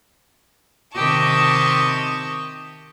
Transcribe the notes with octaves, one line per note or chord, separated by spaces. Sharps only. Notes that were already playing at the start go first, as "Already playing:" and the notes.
C3 D#3 G4 D#5 A5 C#6